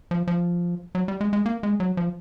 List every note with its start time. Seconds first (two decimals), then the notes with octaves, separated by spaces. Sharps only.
0.11 F3
0.27 F3
0.95 F#3
1.08 G3
1.21 G#3
1.33 G#3
1.46 A#3
1.63 G#3
1.80 F#3
1.97 F3